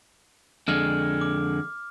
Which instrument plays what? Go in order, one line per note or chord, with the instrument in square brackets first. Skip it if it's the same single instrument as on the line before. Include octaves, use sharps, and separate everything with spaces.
[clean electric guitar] F2 D3 G#3 [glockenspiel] F6
[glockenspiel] D6